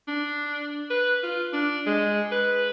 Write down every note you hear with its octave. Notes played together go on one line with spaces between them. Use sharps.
D4
B4
F4
D4
G#3
B4